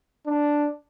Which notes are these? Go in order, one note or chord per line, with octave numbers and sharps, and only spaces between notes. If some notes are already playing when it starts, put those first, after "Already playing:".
D4